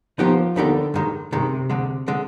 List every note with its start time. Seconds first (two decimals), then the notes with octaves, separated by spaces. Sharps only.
0.18 D#2 D#3 F3 B3 D#4 G4
0.56 D#2 D3 D#3 B3 D#4 G4
0.94 G2 D#3 G#3
1.32 G2 C3 D#3 G#3
1.70 D2 D3 G#3
2.08 D3 G#3